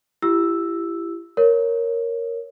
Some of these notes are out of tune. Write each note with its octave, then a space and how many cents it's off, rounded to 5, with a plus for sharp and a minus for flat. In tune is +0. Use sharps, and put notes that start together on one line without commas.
E4 +35 G4 +0 E6 +0
A#4 +0 C#5 +0